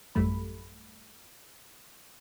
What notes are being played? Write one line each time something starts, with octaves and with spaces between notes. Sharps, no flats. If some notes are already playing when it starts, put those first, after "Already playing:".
A1 F#2 G3 A3 B5